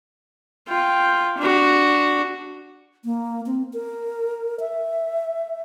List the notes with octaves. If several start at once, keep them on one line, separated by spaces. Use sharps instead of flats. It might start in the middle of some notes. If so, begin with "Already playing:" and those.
F4 G5
D4 F#4
A#3
C4
A#4
E5